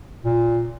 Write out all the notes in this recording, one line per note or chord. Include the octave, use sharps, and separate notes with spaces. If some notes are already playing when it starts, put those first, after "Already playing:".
A#2